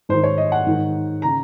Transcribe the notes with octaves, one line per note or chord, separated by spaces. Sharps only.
G#2 D#3 C5
C#5
D#5
F#5
G#2 D#3
C#3 A#5